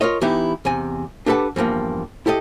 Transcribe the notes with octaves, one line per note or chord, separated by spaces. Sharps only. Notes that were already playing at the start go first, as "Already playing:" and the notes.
F4 A#4 C#5 D#5
E3 B3 D#4 E4 G4
E2 C3 G#5
D4 G4 A4 B4 F#5 A5
E2 G2 F3 A#3
E4 G4 A4 D#5